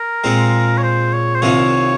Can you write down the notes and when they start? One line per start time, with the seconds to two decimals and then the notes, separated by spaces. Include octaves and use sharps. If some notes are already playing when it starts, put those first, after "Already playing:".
Already playing: A#4
0.24 A#2 G#3 C4 F4
0.78 C#5
0.84 C5
1.13 C#5
1.35 C5
1.42 C2 C3 D#3 A#3 F4 C#5